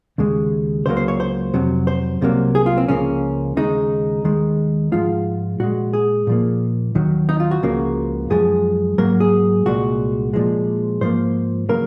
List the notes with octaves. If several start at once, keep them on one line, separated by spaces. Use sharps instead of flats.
D#2 C#3 G#3
C#2 C#3 F#3 A#3 C5
C5
C#5
C5
F2 C3 F#3
C5
C2 C3 F#3 A#3
G#4
F4
C4
C#2 C#3 F3 A#3 C#4
D#2 C#3 G#3 D#4
D#2 D#3 G#3
G#2 F3 G#3 F4
A#2 G#3 F#4
G#4
A#2 F3 A#3
D#2 D#3 F#3
D#4
F4
F#4
C#2 C#3 F3 A#3
F#2 F3 G#3 G#4
G#2 F#3 A#3 A#4
G#4
C2 A#2 G#3 F#4
A#2 F3 G#3
G#2 F3 A#3 C5
C#3 F#3 A#3 A#4